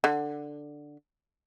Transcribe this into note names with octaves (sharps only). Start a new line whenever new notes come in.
D3